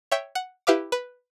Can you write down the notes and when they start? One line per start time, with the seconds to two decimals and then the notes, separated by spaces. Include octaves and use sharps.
0.12 C#5 E5 G5
0.35 F#5 F#6
0.67 E4 G4 B4 E5 F5 D6
0.92 B4